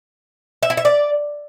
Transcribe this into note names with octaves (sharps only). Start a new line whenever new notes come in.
E5
E4
E5
D5